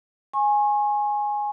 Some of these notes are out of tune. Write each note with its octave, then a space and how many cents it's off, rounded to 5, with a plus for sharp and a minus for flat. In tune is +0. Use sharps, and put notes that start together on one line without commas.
G#5 +0 C#6 -40